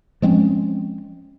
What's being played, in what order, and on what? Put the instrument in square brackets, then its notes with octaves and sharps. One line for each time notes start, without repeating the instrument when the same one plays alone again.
[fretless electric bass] F3 G#3 C4 C#4